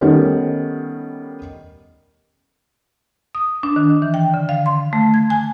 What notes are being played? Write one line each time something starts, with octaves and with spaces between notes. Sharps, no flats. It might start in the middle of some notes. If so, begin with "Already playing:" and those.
D#3 G3 A3 B3 C#4
D#6
D4
D#3
E3
G5
D3
F5
C6
A3
G#6
G#5